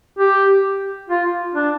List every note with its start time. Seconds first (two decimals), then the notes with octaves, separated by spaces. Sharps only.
0.19 G4
1.09 F4
1.55 D4